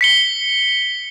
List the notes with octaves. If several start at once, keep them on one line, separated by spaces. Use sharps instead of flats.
B6 C#7 G7